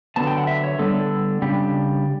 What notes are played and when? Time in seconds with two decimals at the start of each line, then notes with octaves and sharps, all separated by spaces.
0.16 D3 F#3 B3 A5
0.27 G5
0.38 F#5
0.47 E5
0.64 C#5
0.78 D3 G3 B3 D4 A4
0.94 A4
1.42 C#3 G3 D4 G4